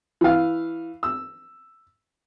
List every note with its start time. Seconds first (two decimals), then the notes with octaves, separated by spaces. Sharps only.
0.21 E3 F5
1.03 E6